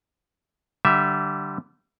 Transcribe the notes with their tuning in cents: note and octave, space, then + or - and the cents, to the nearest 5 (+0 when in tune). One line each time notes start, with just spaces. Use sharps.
D3 +0 G3 -20 E5 +0